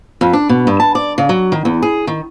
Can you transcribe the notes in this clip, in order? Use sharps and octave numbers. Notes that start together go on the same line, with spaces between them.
F2
D4
B2
G2
A5
D5
C#3
F#3
D#3
E2
G#4
D#3